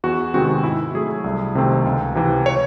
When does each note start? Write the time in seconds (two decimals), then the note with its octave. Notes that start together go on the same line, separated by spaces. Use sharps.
0.04 E2 F#4
0.34 C3 D#3 G#3 C4 F#4
0.63 G#2 E4
0.94 F#3 A3 G#4
1.24 C2
1.55 C3 D#3 A3 C4
1.85 C#2
2.15 C3 E3
2.46 C#5